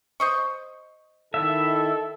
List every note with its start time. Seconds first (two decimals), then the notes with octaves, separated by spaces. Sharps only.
0.20 C5 D#5 C#6
1.34 D#3 E4 A4 E5